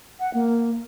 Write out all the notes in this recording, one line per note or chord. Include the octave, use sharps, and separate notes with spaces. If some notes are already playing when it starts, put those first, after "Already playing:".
F#5
A#3